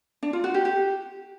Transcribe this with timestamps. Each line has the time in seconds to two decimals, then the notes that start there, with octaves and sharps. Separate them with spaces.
0.23 D4
0.33 F4
0.44 F#4
0.54 G4
0.65 G4